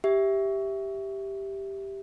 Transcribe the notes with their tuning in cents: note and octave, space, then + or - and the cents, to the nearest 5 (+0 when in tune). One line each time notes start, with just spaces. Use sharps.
G4 +0 E5 +0